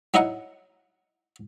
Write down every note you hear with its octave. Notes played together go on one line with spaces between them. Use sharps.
F#3 D#4 E4 D#5 F#5